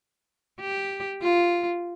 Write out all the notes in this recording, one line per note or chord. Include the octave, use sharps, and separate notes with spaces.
G4
F4